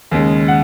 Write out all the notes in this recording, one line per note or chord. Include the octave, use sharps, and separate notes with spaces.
D#2 C#3 G#3
F#5